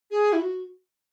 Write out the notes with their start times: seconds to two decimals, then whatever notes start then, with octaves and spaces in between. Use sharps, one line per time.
0.11 G#4
0.33 E4
0.41 F#4